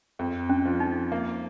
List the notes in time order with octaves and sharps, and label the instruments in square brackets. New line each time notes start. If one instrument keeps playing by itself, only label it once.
[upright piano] F2
[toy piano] C#4
[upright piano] F3
[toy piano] D#4
[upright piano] A#3